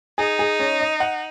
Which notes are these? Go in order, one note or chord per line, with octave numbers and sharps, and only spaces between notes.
D#4 G#4
G#4
C#4
D#5
F#5